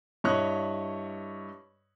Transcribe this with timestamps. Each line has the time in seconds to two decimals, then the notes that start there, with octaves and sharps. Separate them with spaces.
0.24 G2 E4 C#5 D#5 C#6 F#6